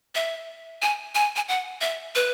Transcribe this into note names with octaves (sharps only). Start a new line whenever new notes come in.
E5
G#5
G#5
G#5
F#5
E5
B4